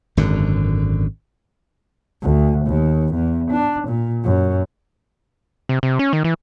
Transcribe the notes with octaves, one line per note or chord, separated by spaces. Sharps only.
G#1 F#2 D3
D2
D#2
E2
D4
A#2
F#2
C3
C3
C#4
D#3
E3